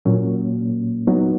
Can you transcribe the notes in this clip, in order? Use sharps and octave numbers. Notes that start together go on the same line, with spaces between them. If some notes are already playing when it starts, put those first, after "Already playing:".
A#2 F#3 A#3 C#4
F#3 B3 D#4